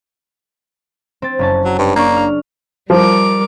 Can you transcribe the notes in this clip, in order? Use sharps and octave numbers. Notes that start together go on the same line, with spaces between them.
C4 A6
F#1 C#4 A5
F#3
G2
A#3 D4 D5 C#6
F6
F3 G3 A#4 D6